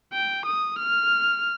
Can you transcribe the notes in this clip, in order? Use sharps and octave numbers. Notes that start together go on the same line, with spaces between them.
G5
D#6
F6